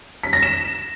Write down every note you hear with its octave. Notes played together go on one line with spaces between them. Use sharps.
B6
A#6
E7